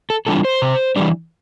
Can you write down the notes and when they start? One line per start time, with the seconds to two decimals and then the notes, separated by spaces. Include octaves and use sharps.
0.10 A4
0.27 E3 G3 D4 F4 A4
0.45 C5
0.62 C3
0.96 E3 G3 D4